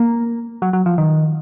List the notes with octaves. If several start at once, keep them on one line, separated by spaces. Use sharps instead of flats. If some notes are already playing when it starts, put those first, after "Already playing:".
Already playing: A#3
F#3
F#3
F3
D#3